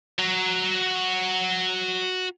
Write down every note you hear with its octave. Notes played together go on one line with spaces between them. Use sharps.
F#4 A#5